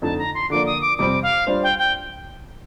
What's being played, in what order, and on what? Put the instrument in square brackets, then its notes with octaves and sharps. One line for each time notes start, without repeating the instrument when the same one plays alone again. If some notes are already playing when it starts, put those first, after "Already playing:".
[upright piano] F2 D3 A3 D#4 [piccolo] A5
[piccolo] A#5
C6
[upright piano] D3 F3 A#3 D4 [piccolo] D6
[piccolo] D#6
D6
[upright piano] F2 C3 G3 C4 [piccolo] D6
[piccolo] F5
[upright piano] G3 D4 F4 C5
[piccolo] G5
G5